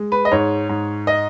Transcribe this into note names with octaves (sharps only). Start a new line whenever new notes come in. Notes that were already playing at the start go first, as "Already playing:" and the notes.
Already playing: G#3
B4
D#5
G#2 C#5
G#2
D#5